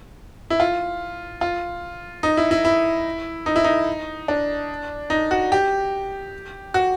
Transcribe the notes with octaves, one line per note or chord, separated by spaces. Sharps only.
E4
F4
F4
D#4
E4
E4
E4
D#4
E4
D#4
D4
D#4
F#4
G4
F#4